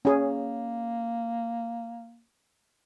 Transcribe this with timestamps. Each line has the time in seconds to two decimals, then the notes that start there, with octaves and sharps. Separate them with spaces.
0.05 A#3 C#4 G#4